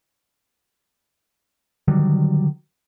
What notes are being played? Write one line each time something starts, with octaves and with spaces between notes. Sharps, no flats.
D3 D#3 F#3 G3